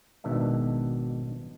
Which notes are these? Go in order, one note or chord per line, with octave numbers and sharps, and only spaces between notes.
G#1 G#2 B2 D#3 D4 E5